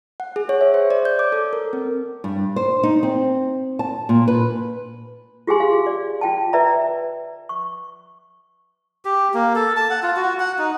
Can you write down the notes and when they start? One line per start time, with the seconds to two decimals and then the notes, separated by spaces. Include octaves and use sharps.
0.20 F#5
0.36 G#4
0.49 C#5
0.61 E5
0.74 C5
0.90 D5
1.05 G6
1.19 D6
1.32 A4
1.53 A#4
1.73 C4
2.24 G2
2.56 C5
2.83 D#4
3.03 C4
3.79 A5
4.09 A#2
4.28 B4
5.47 F4 G4 G#4 G#5 C6
5.60 F4 F5
5.87 D5
6.21 F4 G5 A5
6.53 B4 D5 E5 A#5
7.49 C#6
9.05 G4
9.34 A#3
9.55 A4
9.76 A5
9.90 F#5
10.03 F4
10.16 F#4
10.39 F#5
10.59 D#4